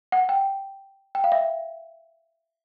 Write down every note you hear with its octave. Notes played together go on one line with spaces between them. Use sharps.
F#5
G5
G5
F5
E5